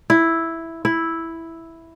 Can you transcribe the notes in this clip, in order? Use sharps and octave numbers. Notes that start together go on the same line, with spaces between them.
E4
E4